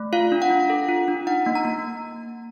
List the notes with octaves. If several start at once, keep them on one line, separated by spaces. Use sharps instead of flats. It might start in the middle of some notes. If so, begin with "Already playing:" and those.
Already playing: A3
F4 F5
D4
F#5
D4
A4
F4
D4
D#4 F#5
A#3
A#5
A#3